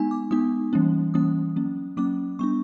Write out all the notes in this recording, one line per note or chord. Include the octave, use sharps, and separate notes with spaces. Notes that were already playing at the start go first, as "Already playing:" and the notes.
Already playing: G#3 B3 D#4 G#5
D6
G#3 B3 D#4 D#6
E3 G3 A#3 C#4
E3 G3 A#3 C#4 D#6
F#3 A#3 C#4
F#3 A#3 C#4 D6
G3 B3 D4 C#6